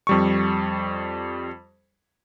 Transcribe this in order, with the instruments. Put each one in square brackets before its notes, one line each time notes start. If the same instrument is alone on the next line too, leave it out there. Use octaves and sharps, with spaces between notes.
[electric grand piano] F2 G3 C#6